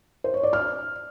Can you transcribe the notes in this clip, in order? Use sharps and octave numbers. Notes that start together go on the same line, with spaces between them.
C5
C#5
D5
F6